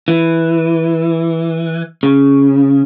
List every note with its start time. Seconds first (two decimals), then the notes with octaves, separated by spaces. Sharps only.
0.08 E3
2.03 C#3